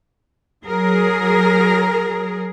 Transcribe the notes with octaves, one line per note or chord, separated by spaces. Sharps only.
F#3 G#4 A#4